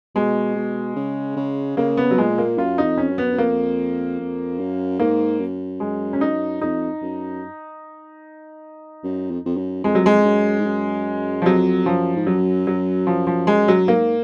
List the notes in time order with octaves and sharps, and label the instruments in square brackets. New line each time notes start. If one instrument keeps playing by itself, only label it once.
[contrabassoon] B2 [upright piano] G#3
[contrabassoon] B2
C#3
C#3
[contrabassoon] C#3 [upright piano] A#3
[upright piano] B3
F#3
[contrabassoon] A#2 [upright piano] G#3
[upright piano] A#3
[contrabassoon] F#2 [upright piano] F4
[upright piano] D#4
[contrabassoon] F2
[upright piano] C#4
[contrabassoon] F#2
[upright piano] B3
[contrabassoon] F#2
[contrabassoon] F2 [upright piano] A#3
[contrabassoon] F2
F#2
[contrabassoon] G#2 [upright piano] A#3
[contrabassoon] F#2
[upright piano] G#3
C#4
D#4
[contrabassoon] F2 [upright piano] D#4
[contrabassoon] F#2
F#2
F2
F2
F#2
[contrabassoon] F2 [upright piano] G#3
[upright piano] F#3
G#3
[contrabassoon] F#2
G#2
F#2
[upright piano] F3
[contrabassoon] F2 [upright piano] F#3
[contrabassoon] F#2 [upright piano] F3
[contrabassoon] G#2
[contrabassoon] F#2 [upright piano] F#3
[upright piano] F#3
F3
F3
G#3
F#3
[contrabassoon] G#2 [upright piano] A#3